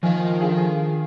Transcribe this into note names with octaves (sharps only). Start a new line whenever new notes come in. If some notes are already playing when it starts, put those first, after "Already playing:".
D#3 F3 D#4 A#4 F5 G#5
D3 F4 G#4